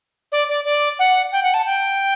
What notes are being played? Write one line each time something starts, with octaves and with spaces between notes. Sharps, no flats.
D5
D5
D5
F#5
G5
F#5
A5
G5